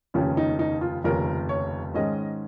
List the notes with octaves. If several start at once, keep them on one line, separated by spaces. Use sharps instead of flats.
F1 D#2 C#3 F3 C#4
D#4
D#4
F4
F1 D#2 C#3 F3 C#4 A#4
C#5
G#2 D#3 G#3 C#4 D#5